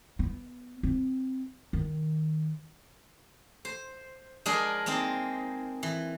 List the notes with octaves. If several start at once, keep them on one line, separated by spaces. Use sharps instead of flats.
B3
C4
D#3
C5
F3 G#3 D4 G#4 A#4 D#5
G#3 A#3 C4 D#4
E3